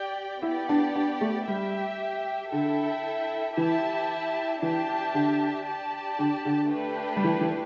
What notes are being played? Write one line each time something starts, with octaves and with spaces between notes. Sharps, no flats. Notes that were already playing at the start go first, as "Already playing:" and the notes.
Already playing: G4 D5 G5
B3 E4 G4 D5
D4
D4
A3
G3 G4 E5 G5
D3 E4 A4 E5 G5
E3 E4 G4 E5 A5
E3 D4 G4 E5 A5
D3
G4 D5 A5
D3
D3
A3 D4 G4 B4
G3
E3
E3